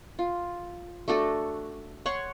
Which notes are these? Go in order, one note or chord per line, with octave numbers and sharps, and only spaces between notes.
F4
A3 D4 F#4 A4
C#5 F#5 C6 C#6